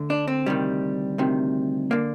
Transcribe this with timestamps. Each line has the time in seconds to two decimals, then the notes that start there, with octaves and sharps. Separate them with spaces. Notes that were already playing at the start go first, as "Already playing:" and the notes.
Already playing: D2 D3
0.10 D4
0.28 C4
0.46 D2 C3 D#3 G3
1.18 D2 C3 D#3
1.91 D3 A#3